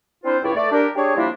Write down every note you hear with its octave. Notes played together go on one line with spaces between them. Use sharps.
C4 D4 E4 F4 C5
C#2 G2 E4 C#5 D5 G5
A3 D5
D4 G4 A#4
D4 G4 G#4 C#5
F3 G3 A#3 C4 D4 E4